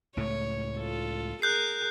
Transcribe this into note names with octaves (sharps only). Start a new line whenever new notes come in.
C#2 A2 A3 C#5
F4 A4
G#4 A#4 F#6 G6 C7